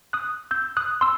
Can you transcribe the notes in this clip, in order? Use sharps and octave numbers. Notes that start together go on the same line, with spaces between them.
D#6 F#6
E6 G6
D#6 F#6
C6 E6